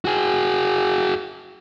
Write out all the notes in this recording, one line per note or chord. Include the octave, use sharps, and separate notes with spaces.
F#4 G#4